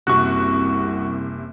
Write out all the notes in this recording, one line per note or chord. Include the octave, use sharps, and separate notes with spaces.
F#1 C2 C3 F#4 C#6 F#6